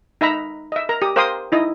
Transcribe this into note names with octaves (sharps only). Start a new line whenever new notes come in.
D#4 E5 A#5 B5
D#5 E5
A#4 A#5
G4 D#6
A#4 C5 F5 G5 C6 D#6
D#4 E4 D#5